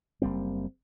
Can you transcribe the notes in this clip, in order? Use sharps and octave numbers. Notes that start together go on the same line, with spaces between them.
F#1 G3 A#3 C4